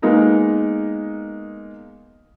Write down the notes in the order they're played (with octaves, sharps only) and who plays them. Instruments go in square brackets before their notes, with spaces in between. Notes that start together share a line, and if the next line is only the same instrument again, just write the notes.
[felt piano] G#3 A#3 B3 D#4 A#4